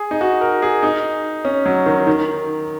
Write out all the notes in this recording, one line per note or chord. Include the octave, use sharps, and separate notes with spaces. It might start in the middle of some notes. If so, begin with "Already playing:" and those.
Already playing: G#4
D#4
F#4
A#4
G#4
D#4
C#4
F#3
D#3
D#3